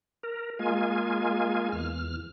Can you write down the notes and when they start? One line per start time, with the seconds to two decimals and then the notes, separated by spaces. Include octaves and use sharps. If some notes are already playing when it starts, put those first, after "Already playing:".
0.23 A#4
0.59 G#3 A#3 F4 G#5
1.72 E2 F6